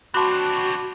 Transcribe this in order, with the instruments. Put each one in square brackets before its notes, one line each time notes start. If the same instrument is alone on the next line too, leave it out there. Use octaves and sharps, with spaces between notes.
[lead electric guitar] C4 D4 [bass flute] F#4 [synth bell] A5 D6 F#6 [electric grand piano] B5 C6